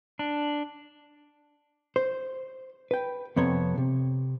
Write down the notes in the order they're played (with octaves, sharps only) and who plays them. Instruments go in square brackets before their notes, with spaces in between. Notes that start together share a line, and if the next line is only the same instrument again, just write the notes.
[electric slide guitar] D4
[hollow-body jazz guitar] C5
B4 G5
F2 C3 B3 A4 C#5 A#5
C3